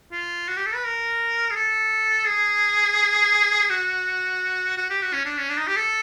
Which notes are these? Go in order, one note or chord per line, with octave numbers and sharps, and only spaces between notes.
F4
F#4
G4
A4
B4
A#4
G#4
A4
G#4
F#4
F#4
G4
F#4
C#4
D4
C#4
D4
D#4
G4
A4